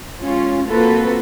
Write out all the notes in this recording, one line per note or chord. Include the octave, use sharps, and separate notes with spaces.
G#3 C#4 F4
A#3 C4 F4 F#4 A4 B4